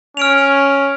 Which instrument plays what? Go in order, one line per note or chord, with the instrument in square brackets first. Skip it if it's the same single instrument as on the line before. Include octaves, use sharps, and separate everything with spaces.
[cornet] C#4 [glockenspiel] F6 D7 F7